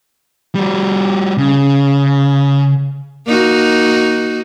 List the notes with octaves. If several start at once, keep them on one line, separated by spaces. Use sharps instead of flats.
G3 F#4
C#3
A#3 D#4 F#4